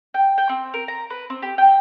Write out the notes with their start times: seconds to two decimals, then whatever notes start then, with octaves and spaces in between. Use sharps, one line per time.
0.14 G5
0.38 G5
0.49 C4
0.74 A#4
0.88 A#5
1.10 B4
1.30 C4
1.42 G4
1.58 G5